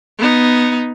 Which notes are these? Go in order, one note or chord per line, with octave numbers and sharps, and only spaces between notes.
B3 D#4